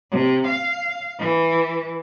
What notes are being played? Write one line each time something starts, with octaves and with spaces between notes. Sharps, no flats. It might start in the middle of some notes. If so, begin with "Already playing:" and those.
C3
F5
E3